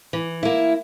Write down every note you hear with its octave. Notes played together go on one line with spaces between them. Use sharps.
E3
A#3 E4